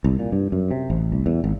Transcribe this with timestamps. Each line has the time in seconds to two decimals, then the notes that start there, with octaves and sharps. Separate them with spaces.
0.04 C2
0.19 A#2
0.32 G2
0.52 F#2
0.71 C3
0.90 A1
1.12 C2
1.26 E2
1.44 G#1